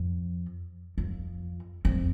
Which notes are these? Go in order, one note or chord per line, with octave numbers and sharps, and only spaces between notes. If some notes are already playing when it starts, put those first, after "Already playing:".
Already playing: F2
F2
F2